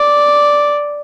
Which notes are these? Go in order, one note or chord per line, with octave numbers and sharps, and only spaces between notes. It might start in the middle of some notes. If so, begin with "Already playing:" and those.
Already playing: D5